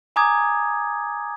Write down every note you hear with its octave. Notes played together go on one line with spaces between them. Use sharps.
G#5 A#5 D6 D#6 G#6